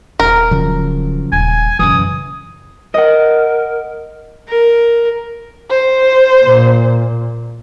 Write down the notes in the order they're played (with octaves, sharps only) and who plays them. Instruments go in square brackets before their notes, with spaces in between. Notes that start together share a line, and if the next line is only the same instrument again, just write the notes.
[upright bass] D#1 [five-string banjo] A#4
[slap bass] C#3 F3 F#3
[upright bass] D#1 [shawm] G#5
[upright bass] F#1 B1 [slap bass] F#2 E3 [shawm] D#6
[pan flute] A#4 [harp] D#5 F#5
[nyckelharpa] A#4
[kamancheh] C5
[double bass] A#2